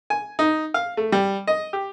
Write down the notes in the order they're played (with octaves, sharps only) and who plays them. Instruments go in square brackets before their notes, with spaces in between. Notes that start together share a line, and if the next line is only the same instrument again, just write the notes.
[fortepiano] G#5
D#4
F5
A3
G3
D#5
G4